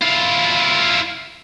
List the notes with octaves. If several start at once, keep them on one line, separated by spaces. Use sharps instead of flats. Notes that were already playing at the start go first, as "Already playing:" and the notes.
E4 F4